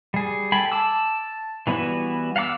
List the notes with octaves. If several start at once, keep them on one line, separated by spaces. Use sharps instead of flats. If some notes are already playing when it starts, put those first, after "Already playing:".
G3 G#4
A4 G5 G#5 B5
A5 D6 E6
E3 G3 B3 E4 F#4
F5 F#5 A5 D6 E6